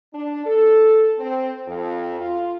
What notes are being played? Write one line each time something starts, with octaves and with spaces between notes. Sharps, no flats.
D4
A4
C4
F2
F4